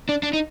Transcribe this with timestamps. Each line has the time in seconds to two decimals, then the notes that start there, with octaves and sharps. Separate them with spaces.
0.09 D4
0.23 D4
0.33 D#4